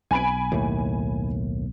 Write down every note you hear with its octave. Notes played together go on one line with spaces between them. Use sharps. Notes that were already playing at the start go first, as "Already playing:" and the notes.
B1 G#5 B5 D7
D#2 A2